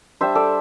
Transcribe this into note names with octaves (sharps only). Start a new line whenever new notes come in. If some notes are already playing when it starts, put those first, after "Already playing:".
G3 D4 C5 E5
A4 D5